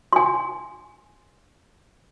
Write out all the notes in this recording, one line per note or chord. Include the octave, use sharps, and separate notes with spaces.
G#5 C6